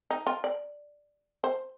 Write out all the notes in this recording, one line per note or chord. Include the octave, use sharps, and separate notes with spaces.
D#4
F4
D5
C5